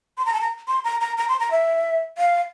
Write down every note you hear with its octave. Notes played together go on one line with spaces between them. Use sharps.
C6
A#5
A5
A#5
C6
A#5
A#5
A#5
C6
A#5
E5
F5